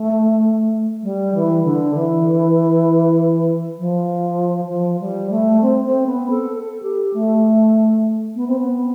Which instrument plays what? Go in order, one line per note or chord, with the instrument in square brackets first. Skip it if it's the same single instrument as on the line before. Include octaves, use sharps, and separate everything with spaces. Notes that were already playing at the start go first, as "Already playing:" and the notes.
Already playing: [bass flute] A3
G3
E3
D3
E3
F3
F3
G3
A3
C4
C4
B3
A4
A4
G4
A3
B3
C4
B3